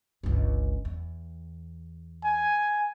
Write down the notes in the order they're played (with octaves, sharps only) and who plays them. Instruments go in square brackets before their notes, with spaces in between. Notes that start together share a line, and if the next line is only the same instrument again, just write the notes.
[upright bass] G1 C#2
E2
[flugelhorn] G#5